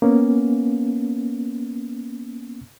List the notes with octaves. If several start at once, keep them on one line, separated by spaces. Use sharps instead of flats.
A#3 B3 C#4